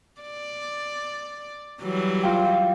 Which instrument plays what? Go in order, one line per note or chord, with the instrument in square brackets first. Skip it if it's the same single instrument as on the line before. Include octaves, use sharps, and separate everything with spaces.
[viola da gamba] D5
E3 F#3 G3
[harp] F4 F5 G5